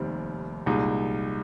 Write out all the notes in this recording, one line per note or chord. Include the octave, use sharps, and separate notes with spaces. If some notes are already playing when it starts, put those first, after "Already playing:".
Already playing: F1 D#2 D#3 G3 C4
C2 A#2 G#3 D#4